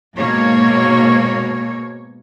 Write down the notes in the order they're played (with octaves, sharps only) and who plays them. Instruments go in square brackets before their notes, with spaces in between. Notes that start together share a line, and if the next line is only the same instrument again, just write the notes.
[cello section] G#2 B2 A#3 C#5